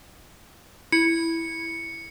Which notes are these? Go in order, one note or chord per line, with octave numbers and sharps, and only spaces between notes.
E4 C#7